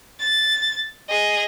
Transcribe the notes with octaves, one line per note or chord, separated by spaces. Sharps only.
A6
G#4 D#5